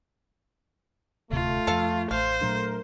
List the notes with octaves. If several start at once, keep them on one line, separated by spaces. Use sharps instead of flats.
D#1 D2 C3 A3 F4
F2 F3 A4 F5
A1 C5 F5
A#2 F#3 A3 D4 A#4